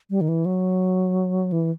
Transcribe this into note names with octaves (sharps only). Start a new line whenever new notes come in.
G3
D#3
E3
F#3
E3